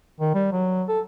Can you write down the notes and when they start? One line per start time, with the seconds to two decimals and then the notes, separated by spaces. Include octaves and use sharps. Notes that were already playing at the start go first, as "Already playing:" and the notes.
0.20 D#3
0.34 G3
0.52 F#3
0.88 A4